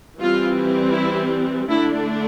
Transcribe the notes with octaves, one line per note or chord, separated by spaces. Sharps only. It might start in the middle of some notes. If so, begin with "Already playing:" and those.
E3 G3 C4 F4
E4
D3 A3 D4 E4